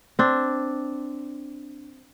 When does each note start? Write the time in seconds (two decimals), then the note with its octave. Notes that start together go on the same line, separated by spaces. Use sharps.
0.19 C4 D4